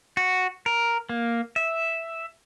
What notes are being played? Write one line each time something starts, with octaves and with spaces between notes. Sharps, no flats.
F#4
A#4
A#3
E5